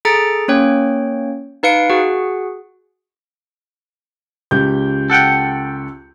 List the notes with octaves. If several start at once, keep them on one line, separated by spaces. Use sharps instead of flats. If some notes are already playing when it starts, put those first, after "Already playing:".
G#4 A4 A#5 A6 C#7 D7
A#3 C#4 C#5 G5
D#4 B4 F5 C#7 D7
F#4 G#4 F#5
C#2 G4 G6
A4 F#5 G5